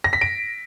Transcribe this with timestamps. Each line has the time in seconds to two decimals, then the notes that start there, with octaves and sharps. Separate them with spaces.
0.04 A#6
0.13 B6
0.21 D7